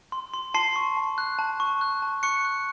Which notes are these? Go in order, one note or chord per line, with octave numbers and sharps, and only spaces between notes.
C6
C6
A5 C6 C7
C#6
A5
F#6
A5
C#6
F#6
A5
C#6 F#6 C#7
F#6